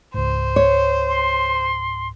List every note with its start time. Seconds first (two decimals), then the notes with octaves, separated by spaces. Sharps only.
0.14 C#2 G#2 C5
0.56 C#5
1.09 C6